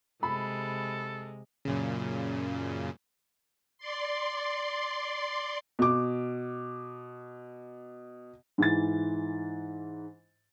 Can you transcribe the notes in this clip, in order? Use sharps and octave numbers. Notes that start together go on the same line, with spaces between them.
C3 G#3 A4 B5
F#2 A#2 C#3
D5 C6
B2 D6
G#2 E3 A6